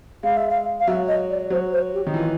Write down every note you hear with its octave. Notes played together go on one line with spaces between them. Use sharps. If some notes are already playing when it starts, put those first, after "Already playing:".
G#3 F5
E5
F5
F5
F#3 E5
D#5
D5
F#3 C5
C5
G4
D#3
E3 F4